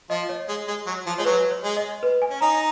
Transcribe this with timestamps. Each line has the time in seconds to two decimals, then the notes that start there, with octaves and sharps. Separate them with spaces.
0.10 F3 D#5
0.29 C#5
0.48 G#3
0.68 G#3
0.87 F#3
1.06 F3
1.18 G#3 C#5
1.25 F#3 B4
1.51 C#5
1.63 G#3
1.77 D#5
2.03 B4
2.22 G#5
2.30 C#4
2.41 D#4 A#5